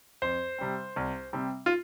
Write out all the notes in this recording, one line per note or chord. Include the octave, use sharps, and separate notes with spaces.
F2 C5
C3 G3 C4
C2
C3 G3 C4
F4